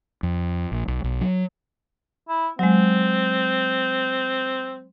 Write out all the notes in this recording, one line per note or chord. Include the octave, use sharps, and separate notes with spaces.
F2
A#1
B1
B1
F#3
E4
F#3 G#3 C4